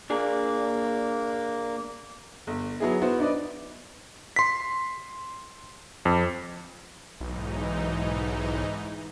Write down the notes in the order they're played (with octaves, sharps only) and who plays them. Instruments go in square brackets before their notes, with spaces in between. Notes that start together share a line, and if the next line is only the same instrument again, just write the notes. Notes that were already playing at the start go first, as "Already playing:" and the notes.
[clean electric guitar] A#2 D4 G#4 [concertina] A#3
[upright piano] G1
F#3 B3 E4 G#4
B3 E4 F#4 C5
D4 D#4 B4 D5
[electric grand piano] C6 B6
F2
[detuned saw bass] B1 [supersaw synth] G#2 E3 D#4